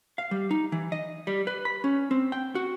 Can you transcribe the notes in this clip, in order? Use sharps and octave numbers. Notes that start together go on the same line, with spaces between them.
F5
G3
D#4
E3
D#5
G3
B4
B5
C#4
C4
G5
F#4